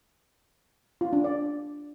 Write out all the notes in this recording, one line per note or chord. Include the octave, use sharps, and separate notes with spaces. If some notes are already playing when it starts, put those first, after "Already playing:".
F4
D4
D5